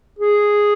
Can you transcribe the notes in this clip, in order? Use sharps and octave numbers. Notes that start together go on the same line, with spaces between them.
G#4